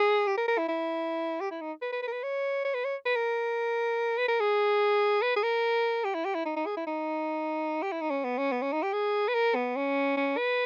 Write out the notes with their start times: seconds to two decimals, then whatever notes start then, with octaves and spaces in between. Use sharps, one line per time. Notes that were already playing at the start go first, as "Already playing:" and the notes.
Already playing: G#4
0.27 G4
0.38 A#4
0.48 A#4
0.58 E4
0.68 E4
1.41 G4
1.51 E4
1.61 D#4
1.82 B4
1.92 B4
2.03 B4
2.08 A#4
2.13 B4
2.23 C#5
2.65 C#5
2.74 B4
2.85 C#5
3.06 B4
3.16 A#4
4.18 B4
4.28 A#4
4.40 G#4
5.22 B4
5.36 G#4
5.43 A#4
6.04 G4
6.15 E4
6.25 G4
6.35 E4
6.45 D#4
6.56 D#4
6.66 G#4
6.77 E4
6.87 D#4
7.83 G4
7.92 E4
8.01 D#4
8.10 C#4
8.24 B3
8.38 C#4
8.52 B3
8.62 C#4
8.73 D#4
8.83 G4
8.93 G#4
9.28 B4
9.34 A#4
9.55 B3
9.76 C#4
10.17 C#4
10.37 B4